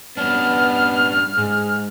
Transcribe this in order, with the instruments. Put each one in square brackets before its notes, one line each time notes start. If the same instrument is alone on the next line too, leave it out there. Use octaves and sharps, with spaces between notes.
[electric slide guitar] G3 C#4 D4 [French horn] B3 [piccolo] F6
[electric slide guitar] G#2 [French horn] G#4